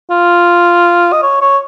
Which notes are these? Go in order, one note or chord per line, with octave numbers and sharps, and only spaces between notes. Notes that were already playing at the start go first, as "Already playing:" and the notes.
F4
D#5
C#5
C#5